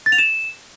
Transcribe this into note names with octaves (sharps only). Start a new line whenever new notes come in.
A6
F7
E7